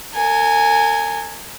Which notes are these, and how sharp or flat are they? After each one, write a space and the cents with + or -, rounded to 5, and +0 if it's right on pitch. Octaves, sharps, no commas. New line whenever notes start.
A#4 -45 G#5 +0